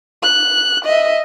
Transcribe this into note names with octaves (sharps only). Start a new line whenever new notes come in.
F#6
D#5 E5